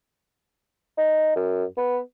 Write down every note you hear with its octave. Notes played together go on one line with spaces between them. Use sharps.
D#4
F#2
B3